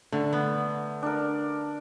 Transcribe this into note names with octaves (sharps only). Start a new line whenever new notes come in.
D3 A3
B3
D4 A#4